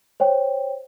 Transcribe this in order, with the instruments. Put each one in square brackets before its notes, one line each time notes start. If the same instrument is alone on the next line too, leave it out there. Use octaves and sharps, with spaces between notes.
[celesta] C5 C#5 G5